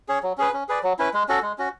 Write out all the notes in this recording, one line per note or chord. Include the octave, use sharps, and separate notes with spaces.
C#4 G#4 C#5
F#3
C#4 G#4 B4
C#4
G#4 B4 D5
F#3
C#4 E4 B4
G#3
C#4 F#4 A4
G#3
C#4 F#4